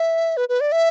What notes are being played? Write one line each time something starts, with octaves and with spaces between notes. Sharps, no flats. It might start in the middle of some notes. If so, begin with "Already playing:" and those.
Already playing: E5
B4
B4
D5
E5